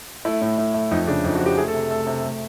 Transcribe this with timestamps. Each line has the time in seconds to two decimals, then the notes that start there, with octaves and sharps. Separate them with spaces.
0.25 A3 E4
0.41 A2
0.58 A2
0.74 A3
0.91 F2 D#4
1.07 C#3 D4
1.24 F2 D#4
1.35 F#4
1.41 F3
1.46 G4
1.57 A3 G#4
1.68 A4
1.74 C3
1.90 A3 A4
2.07 C3
2.24 A3